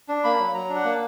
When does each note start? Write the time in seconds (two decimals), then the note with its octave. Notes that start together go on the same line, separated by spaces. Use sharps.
0.09 D4
0.24 A#3 B5
0.40 F#3
0.54 F#3 A#5
0.69 D4
0.75 F#5
0.84 A#3